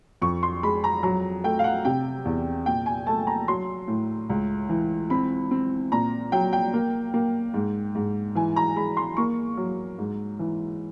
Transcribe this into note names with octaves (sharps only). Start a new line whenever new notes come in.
F2 C#6
C6
G#3 B5
A#5
F#3 A#5
A3 G5
F5
F#5
C3 G5
E2
A#2 G5
G#5
A3 A5
A#5
F#3 C6
A2
C#2
E3
C4 B5
C4
A#2 A#5
F#3 G5
G5
A#3
A#3
G#2
G#2
E3 G#5
A#5
G#3 B5
C6
A#3 C#6
F#3
G#2
E3